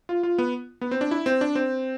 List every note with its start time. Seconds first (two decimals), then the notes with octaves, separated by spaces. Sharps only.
0.09 F4
0.23 F4
0.38 B3
0.81 B3
0.91 C4
1.01 D4
1.11 E4
1.26 C4
1.41 D4
1.55 C4